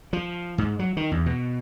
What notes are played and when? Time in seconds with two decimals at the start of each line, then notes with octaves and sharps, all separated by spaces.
0.13 F3
0.58 G#2
0.79 F#3
0.97 D#3
1.12 E2
1.26 B2